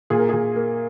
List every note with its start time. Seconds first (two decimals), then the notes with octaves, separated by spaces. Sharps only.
0.10 A#2 G#4
0.19 A#4
0.29 A#2 G#4
0.56 A#3